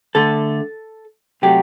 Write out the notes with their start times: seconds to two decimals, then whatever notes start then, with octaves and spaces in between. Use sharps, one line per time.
0.15 D3 A3 A4
1.42 C3 F#3 A3 G4